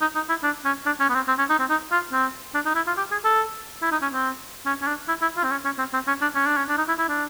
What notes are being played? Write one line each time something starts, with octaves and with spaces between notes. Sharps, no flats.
D#4
D#4
E4
D4
C#4
D4
C#4
B3
C4
C4
C#4
D#4
C4
D#4
F4
C4
D4
D#4
E4
F4
G4
G#4
A4
E4
D#4
C#4
C4
C#4
C#4
D4
E4
E4
F4
C4
C#4
C#4
C4
C4
C#4
D4
C#4
D4
C#4
D4
D#4
E4
E4
D4